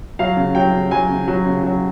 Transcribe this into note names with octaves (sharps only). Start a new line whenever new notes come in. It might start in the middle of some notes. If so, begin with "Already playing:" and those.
F#3 F5
C#3
F#3 G5
C#3
F#3 G#5
C#3
F#3
C#3
F#3